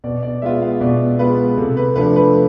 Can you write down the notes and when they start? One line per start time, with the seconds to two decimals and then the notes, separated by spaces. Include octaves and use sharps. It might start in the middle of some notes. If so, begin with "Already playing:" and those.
0.04 B2 D5
0.23 D5
0.42 G#3 B3 F4 E5
0.62 F5
0.81 B2 D5
1.19 G#3 B3 F4 B4
1.58 C3 A4
1.77 B4
1.96 F3 A3 D4 B4
2.16 B4